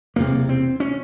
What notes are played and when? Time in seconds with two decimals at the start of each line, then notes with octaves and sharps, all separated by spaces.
0.16 E1 E2 C3 A#3
0.49 C4
0.80 C#4